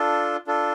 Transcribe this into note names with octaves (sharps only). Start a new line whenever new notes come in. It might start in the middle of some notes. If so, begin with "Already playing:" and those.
Already playing: D4 F4 A4
D4 F4 A4